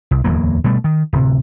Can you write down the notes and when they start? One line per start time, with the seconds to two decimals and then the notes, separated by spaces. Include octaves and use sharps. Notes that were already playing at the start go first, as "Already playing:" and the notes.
0.11 C2
0.24 D1 E2 F#3 A#3
0.64 B2 G3 A3
0.84 D#3
1.13 D1 C3